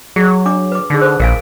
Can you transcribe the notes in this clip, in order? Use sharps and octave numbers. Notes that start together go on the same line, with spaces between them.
F#3 G#4
D4 D6
B4 D6
D3 D#4 G#4
A4 B4 C5
A#1 A#4 F5 G#5